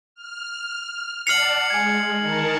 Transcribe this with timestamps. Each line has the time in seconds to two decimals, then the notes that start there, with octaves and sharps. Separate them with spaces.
0.15 F6
1.27 D5 F#5 A5 F6 C7 C#7 F7 F#7
1.70 G#3 G#5 G#6
2.19 D#3 A#4 A5